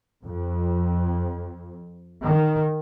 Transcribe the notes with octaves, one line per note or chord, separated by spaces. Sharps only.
F2
D#3